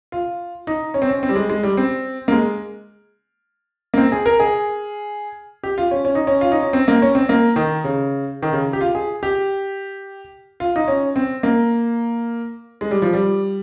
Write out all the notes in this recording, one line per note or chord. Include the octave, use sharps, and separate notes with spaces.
F4
D#4
C#4
C4
C#4
C4
G3
G#3
G#3
G3
C4
A#3
G#3
A#3
C4
G#4
A#4
G#4
G4
F4
C#4
C#4
D#4
C#4
F4
D#4
C#4
C4
A#3
C#4
C4
A#3
D#3
C#3
D#3
C#3
G4
F4
G#4
G4
F4
D#4
C#4
C4
A#3
G#3
G3
F3
G3